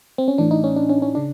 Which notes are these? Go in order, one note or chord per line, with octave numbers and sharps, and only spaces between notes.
C4
C#4
A2 E3 D4
D#4
C#4
D4
C#4
C#4
C#3 D4